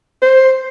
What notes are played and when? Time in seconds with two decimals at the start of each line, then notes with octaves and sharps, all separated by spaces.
0.22 C5